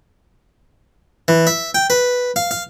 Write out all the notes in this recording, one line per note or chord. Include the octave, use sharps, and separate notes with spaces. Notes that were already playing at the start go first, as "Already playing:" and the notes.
E3
E5
G5
B4
F5
F5